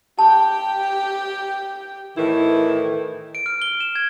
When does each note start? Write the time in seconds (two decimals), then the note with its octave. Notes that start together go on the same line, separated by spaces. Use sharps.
0.19 G4 G5 A5
2.17 A2 D#3 E3 E4
3.35 D7
3.46 F6
3.62 G7
3.80 E7
3.96 G#6